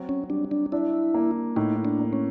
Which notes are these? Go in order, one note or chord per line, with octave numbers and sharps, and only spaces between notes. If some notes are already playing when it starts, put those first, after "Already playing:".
Already playing: F#3 C4
C#4
G3 D4
D4
D4 E4
A#3
A2 D#4
D4
A#3
C#4